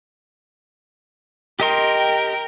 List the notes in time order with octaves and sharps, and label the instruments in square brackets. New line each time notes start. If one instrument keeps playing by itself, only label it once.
[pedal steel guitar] G4 D#5 C6 [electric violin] A#4 G5